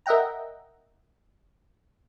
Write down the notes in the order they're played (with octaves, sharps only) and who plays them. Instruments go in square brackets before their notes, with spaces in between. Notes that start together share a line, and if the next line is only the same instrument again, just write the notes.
[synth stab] A#4 D#5 E5 F#5 G5 A#5